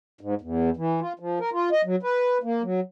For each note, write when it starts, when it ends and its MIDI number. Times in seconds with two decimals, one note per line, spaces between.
0.21 0.35 44
0.41 0.70 40
0.77 1.00 52
1.01 1.13 65
1.20 1.39 53
1.40 1.50 70
1.52 1.69 65
1.72 1.81 75
1.85 1.96 54
2.03 2.38 71
2.43 2.62 58
2.62 2.80 54